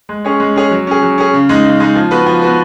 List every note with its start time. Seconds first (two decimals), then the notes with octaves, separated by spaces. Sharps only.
0.09 G#3
0.25 C#4 G#4 C#5
0.40 G#3
0.56 C#4 G#4 C#5
0.71 F#3
0.87 C#4 G#4
1.02 F#3
1.18 C#4 G#4
1.33 C#3
1.49 G#3 D#4
1.64 C#3
1.80 G#3 D#4
1.95 F3
2.11 B3 F#4 B4
2.26 F3
2.42 B3 F#4 B4